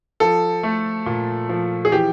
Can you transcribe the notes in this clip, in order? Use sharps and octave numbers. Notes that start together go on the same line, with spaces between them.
F3 A4
A3
A#2
F3
G#4
E3 G4